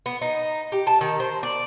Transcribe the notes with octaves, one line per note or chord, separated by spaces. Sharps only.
B3
D#4
G4
A5
D#3
C5
D5